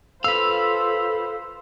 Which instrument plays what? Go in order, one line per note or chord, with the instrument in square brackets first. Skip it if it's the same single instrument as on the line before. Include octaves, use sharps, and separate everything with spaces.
[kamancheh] F4 C5 [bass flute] A4 [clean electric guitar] B4 F5 [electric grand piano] E6